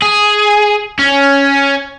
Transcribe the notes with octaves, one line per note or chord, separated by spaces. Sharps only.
G#4
C#4